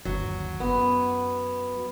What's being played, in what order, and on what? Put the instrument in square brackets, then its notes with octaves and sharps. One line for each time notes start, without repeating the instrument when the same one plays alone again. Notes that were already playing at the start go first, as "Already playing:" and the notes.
[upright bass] G1 D#2 [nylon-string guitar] F#3
[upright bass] F#2 [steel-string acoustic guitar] B3